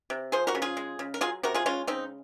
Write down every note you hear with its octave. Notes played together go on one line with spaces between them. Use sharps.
C3
F3 G#4 C5
F#4 A#4
C#3
F4 G#4
G#3
C#3
A#4
F#3 F4 G#4
C3 F#4 A#4
F4 G#4
G#3 C#4 F4
C#3 C4 D#4